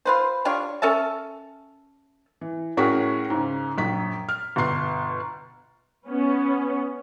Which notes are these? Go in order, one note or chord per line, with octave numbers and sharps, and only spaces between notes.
F4 B4 C5
D4 F4 G4 C#5
C#4 A4 E5 A5
E3
A2 C#4 F#4 G#4 A#4 B6
G#2 C#3
A#1 F#2 B6
F6
G1 B2 C6 C7
B3 C#4